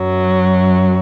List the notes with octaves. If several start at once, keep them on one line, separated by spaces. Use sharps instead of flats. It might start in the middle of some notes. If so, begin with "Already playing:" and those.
Already playing: F#2 F#3